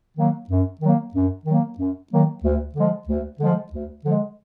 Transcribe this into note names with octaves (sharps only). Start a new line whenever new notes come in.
D#3 F#3 A#3
F#2
D#3 F#3 A#3
F#2
D#3 F#3 A#3
F#2
D#3 F#3 A#3
D2
D3 F3 G#3
D2
D3 F3 G#3
D2
D3 F3 G#3